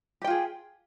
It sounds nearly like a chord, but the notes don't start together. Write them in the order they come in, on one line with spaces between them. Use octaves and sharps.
G4 G5 F4 G#4